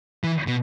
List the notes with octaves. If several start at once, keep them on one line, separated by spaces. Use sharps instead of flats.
E3
B2